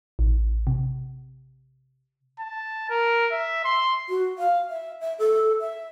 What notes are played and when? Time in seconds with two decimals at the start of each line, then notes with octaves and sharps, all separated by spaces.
0.19 A1
0.67 C3
2.39 A5
2.90 A#4
3.31 E5
3.65 C6
4.09 F#4
4.38 F5
4.69 E5
5.01 E5
5.19 A4
5.60 E5